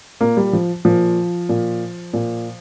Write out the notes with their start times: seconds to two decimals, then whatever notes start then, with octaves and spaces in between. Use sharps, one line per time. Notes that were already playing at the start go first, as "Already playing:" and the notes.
0.21 A#2 A#3
0.37 G3
0.53 F3
0.85 A#2 F3
1.49 A#2
2.13 A#2